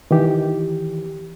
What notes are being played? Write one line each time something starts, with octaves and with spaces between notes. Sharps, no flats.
D#3 E3 G4